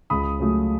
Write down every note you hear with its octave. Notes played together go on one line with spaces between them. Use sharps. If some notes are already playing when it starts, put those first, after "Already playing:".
C#2 B5 D#6
C#3 F#3 A3